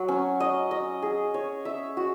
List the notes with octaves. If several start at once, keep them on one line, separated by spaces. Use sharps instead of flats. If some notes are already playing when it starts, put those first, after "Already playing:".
Already playing: F#3
C#4
D#5
D#5
G#4
C#5
E5
F#4